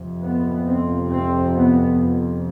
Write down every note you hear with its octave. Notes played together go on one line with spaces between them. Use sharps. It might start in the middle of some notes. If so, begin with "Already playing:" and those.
Already playing: F2 C3
B3
C4
C4
B3